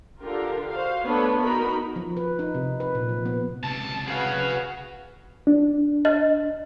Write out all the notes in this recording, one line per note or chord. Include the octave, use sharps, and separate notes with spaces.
D3 F4 G4 A#4
F#4 C5 F5
A3 B3 D4 A4 B4 C#5
B3 D#4 F#4 A#4 B5
F3
B4
D#4
C3
B4
A#2
F3
B3
C#2 C3 A5
F#4 G#4 B4 F5
D4
D#5